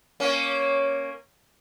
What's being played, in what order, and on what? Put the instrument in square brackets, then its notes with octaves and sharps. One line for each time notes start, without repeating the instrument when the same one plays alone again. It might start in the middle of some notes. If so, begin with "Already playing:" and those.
[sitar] A#3 C#4